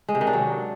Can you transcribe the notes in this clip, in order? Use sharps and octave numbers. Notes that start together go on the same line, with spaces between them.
G#3
C3
D#3
D4
F#3